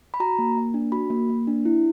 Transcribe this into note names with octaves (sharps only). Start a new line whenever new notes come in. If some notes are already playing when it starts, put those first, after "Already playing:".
B5
F#4 A#5
A#3
A#3
D4
F#4 B5
A#3
A#3
D4
E4